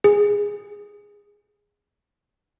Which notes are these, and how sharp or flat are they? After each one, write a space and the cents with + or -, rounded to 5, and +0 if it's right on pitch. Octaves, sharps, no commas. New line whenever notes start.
G#4 -15